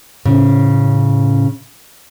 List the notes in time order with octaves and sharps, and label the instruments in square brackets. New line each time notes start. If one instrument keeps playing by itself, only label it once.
[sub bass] A2 [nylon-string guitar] C#3